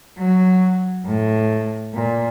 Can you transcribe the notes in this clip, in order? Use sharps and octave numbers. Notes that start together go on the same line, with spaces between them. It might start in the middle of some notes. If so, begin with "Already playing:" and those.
F#3
A2
A#2